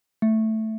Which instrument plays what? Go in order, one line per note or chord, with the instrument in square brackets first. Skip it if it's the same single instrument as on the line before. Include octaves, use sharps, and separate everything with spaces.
[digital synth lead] A3